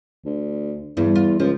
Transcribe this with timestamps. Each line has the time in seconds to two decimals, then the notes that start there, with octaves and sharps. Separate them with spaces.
0.25 D2
0.97 E2 G2
1.15 F4
1.40 C#2 F3